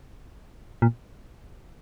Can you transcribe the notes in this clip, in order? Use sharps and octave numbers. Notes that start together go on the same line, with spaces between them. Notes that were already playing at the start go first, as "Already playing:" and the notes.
A#2